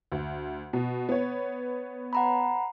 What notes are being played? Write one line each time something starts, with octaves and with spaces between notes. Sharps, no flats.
D2
B2
B3 C#5
F#5 A#5 B5